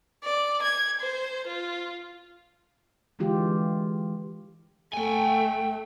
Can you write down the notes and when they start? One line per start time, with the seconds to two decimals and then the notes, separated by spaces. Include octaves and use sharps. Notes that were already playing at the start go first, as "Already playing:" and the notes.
0.24 D5
0.63 G#6
1.01 C5
1.48 F4
3.19 D3 E3 G#3 F4 G4
4.94 A3 G5 G#5